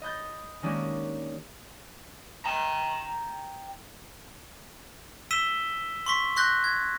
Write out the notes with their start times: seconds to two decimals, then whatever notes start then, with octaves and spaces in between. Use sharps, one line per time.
0.02 D#5 B5 G6 A6
0.62 D#3 G#3 A#3 C#4 D4 G4
2.46 G5 A#5
5.31 E6 B6 D#7 E7 G7
6.06 C6 C#6 B6
6.36 C6 C#6 F#6 G6 A#6
6.64 G#6